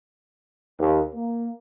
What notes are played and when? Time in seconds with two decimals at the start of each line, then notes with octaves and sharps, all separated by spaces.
0.78 D#2
1.13 A#3